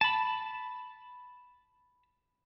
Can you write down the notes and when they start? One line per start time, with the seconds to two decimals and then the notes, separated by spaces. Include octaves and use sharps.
0.01 A5 B5